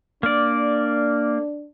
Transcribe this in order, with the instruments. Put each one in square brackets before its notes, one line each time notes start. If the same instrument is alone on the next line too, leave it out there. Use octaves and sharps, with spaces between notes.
[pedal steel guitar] A#3 D5 [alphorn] D4